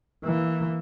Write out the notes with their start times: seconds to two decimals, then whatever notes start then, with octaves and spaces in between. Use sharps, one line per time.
0.24 E3 A#3